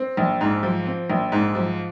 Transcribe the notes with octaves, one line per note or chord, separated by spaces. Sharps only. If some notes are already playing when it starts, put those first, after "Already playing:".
Already playing: C4
A#1
G#2
F3
C4
A#1
G#2
F3